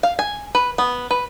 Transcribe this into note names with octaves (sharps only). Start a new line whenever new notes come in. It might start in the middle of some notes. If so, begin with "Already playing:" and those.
F5
G#5
B4
B3
B4